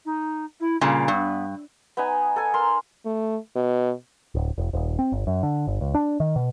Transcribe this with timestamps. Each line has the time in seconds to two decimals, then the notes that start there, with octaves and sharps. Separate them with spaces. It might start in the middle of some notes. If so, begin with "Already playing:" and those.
0.05 D#4
0.60 E4
0.81 A#2 C#3 G3
1.08 G2 B3
1.97 B3 D#4 G#5
2.36 A4 G#5
2.54 A#4 A#5 C6
3.05 A3
3.55 B2
4.35 D1
4.58 E1
4.73 D#1
4.99 C4
5.12 G1
5.27 F#2
5.43 D3
5.67 G1
5.81 C#2
5.94 D4
6.20 D#3
6.36 B2